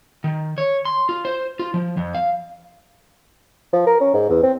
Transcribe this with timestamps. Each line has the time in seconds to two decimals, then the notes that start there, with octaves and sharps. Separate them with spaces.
0.24 D#3
0.58 C#5
0.85 C6
1.09 F4
1.25 C5
1.59 F4
1.74 F3
1.97 F2
2.15 F5
3.73 F3
3.87 A#4
4.01 C#4
4.14 G#2
4.30 E2
4.43 C4